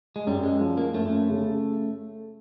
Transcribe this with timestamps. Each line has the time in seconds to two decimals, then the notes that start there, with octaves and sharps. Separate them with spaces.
0.16 G#3
0.27 F#2 G3
0.43 G#3
0.61 F3
0.77 A#3
0.94 F#2 A3
1.30 C#3